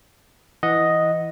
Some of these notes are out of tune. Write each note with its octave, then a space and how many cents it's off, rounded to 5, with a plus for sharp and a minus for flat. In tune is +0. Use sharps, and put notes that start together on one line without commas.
E3 +0 D#5 +0 F#5 -10